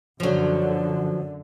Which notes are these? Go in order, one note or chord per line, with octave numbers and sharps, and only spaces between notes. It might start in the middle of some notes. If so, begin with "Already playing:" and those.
F#2 D3 F3 F#3